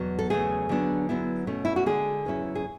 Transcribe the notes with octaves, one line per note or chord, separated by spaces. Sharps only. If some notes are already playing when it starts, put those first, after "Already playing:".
Already playing: E2 B2 F#3
A4
E2 C#3 F#3 A3 G#4
D3 F#3 B3 D4
D3 F#3 B3 E4
B2 A3 C#4
E4
F#4
D3 G#3 D4 G#4
E2 C#3 F#3 C#4 E4
G#4